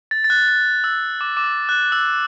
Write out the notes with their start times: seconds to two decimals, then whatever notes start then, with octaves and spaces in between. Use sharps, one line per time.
0.11 A6
0.24 A6
0.30 F#6
0.48 A6
0.84 E6
1.21 D6
1.37 D6
1.44 E6
1.69 F#6
1.92 E6